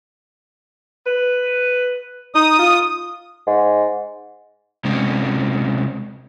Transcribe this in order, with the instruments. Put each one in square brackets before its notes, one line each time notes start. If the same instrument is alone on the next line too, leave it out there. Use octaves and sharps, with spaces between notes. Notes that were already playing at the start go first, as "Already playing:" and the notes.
[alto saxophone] B4
[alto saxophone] D#4 [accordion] D#6
[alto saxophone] F4
[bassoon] G#2
[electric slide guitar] C3 G#3 C4 C#4